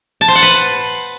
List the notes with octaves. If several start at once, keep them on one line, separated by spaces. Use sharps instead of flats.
A5
C5
F#5
B4